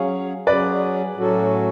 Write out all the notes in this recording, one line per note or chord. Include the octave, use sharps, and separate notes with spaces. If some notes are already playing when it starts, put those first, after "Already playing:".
Already playing: F#3 C#4 G#4 C#5 F5
F#3 C#4 G#4 B4 D5
A2 F#3 C#4 F#4 A4